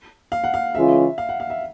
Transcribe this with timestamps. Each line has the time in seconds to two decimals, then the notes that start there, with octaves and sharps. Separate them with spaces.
0.32 F5
0.44 F#5
0.54 F5
0.75 C#3 E3 G#3 C#4 F4 E5
1.18 F5
1.29 F#5
1.40 F5
1.50 E5